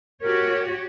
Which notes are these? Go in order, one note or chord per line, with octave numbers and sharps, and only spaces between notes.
F#4 G4 A#4 C#5